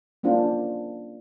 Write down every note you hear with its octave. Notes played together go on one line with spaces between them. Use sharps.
A#3 C#4 D4 F4 C5